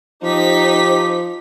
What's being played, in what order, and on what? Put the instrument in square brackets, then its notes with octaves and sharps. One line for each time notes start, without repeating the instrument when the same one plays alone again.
[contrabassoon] F3 [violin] D#4 B6 [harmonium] G4 [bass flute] C5